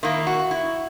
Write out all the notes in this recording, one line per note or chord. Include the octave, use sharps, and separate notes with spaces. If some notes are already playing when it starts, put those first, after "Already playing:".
D#3 A#3 E4
F#4
E4